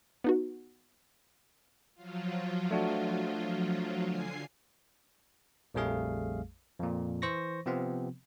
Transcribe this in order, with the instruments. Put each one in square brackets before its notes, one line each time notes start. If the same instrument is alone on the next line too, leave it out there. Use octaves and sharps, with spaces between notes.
[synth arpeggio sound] B3 D#4 F#4
[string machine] F3 F#3 F4
[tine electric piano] A3 D4 F#4
[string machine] D3 G#5 C7
[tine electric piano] A#1 F2 G3 A3 G#4 F5
F2 A#2
E3 C5 C#6 A#6
C3 F3 B3 C4